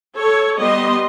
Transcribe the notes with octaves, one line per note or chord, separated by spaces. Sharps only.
A4 C#5
G3 B3 D#5 C6